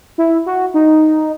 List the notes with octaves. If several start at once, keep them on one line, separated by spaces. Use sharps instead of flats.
E4
F#4
D#4